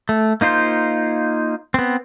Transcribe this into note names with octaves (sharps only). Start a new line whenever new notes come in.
A3
A#3 D#4 F4 C5
B3 C4